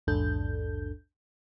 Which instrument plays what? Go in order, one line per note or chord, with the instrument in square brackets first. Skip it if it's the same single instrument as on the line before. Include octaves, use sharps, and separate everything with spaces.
[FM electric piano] A#1 E2 G#2 D4 A4 G6